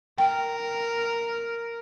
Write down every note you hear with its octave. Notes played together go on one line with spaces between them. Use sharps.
A#4 G5